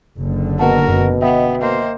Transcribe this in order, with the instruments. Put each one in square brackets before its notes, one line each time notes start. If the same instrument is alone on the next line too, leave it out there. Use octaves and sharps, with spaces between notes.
[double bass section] F#1 D3
[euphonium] B2 [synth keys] A#3 F#5 A5 [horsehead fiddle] F#4 A#4
[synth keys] F#2 [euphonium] B2
[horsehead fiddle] B3 [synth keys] D#5 E5 G5
[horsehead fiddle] A#3 C5